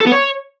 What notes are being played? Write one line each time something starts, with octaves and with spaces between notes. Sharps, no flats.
A4
B3
C#5